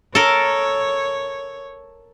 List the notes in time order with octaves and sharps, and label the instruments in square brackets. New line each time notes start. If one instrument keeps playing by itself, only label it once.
[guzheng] A4 A#4 [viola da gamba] C#5